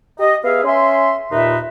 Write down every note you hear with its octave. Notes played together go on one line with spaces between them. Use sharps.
G4 D#5
B3 G#4 E5 F5
C#4 E5 G#5 C6
D#2 A#2 D#4 B4 E5